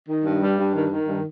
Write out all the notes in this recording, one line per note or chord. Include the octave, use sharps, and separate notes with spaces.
D#3
G2
G3
G2
D#3
D#3
G2